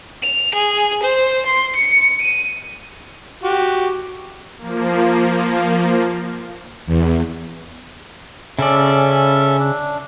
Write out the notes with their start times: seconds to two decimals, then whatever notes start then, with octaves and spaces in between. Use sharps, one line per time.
0.23 F7
0.55 G#4
1.03 C5
1.46 C6
1.76 C#7
2.22 D#7
3.44 F#4 G4
4.58 F3 A#3
6.87 E2
8.59 C#3 C#4 A4 D5 E5
9.60 D4